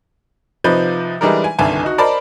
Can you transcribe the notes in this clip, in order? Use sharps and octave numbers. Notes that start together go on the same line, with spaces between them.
C3 F3 D#4 B4 G6
E3 G3 G#3 D4 D#4 A#4
G#5
G1 C2 D3 D#3 G#5 A5
D#4 F#4
A#4 C5 D5 D#5 A5 B5